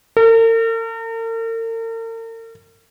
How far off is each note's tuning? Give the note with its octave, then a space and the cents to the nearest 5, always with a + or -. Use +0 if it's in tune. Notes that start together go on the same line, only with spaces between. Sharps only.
A#4 -45